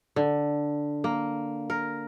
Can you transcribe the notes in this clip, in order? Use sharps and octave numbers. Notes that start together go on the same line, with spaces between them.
D3
A#3
A#4